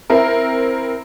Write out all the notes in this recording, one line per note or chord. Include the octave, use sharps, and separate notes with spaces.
C4 E4 A#4